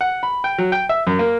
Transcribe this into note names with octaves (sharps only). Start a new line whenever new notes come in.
F#5
B5
G5
F#3
G5
E5
F#2
A#3